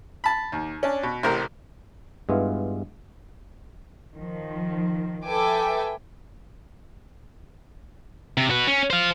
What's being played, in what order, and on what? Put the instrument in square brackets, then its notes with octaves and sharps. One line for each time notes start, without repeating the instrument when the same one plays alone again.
[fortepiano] A5 B5
D#2
C#4 D4
B2
A1 C3 A#4 C5
[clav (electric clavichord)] G2 G#3 B3 E4 F4
[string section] D#3 F3
A4 B4 E5 G5 G#5 D6
[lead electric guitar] C3
F#4 B4
C#4
C5 F5